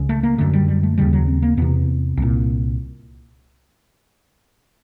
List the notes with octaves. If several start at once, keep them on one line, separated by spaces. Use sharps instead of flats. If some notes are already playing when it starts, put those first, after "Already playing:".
Already playing: C#2 C#3
A3
A#3
F#2 D3 A3
G3
G3
A3
D#2 C#3 G3
F#3
C4
A#3
E2 C3 B3
C2 A#2